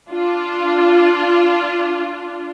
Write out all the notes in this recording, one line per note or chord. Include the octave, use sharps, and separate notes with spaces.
D4 F4